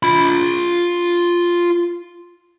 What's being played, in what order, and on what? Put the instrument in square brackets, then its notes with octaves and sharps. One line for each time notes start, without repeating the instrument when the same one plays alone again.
[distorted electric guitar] F4 B5